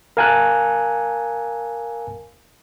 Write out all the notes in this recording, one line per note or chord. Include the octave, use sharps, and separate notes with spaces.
A#4 F5 G#5 A5 F#6